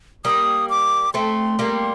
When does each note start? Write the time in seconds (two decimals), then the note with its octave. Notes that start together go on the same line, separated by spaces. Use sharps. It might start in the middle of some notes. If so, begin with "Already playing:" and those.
0.25 G3 A#3 D#6
0.70 D6
1.14 A3 C4 C6
1.59 G3 A#3